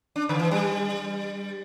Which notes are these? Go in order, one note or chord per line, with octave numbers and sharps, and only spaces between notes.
D4
D3
E3
G3